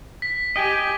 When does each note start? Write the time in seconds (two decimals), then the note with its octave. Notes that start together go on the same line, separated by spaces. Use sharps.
0.22 B6
0.56 G4 D#5 G5 G#5